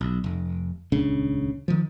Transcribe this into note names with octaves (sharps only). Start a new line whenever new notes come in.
B1
F1
D#1 C#2 C#3 D4
D#3 F3